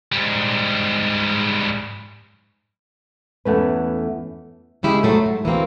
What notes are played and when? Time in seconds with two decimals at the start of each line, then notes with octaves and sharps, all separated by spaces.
0.12 G#2 G3
3.45 E2 A3 C#4 B4 F#5
4.83 C#3 G#3 E4 G4 G#4 A#4
5.03 G#2 F#3 A3 C5
5.26 G#2
5.45 E3 F#3 A#3 C4